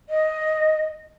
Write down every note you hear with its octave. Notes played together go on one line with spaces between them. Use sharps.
D#5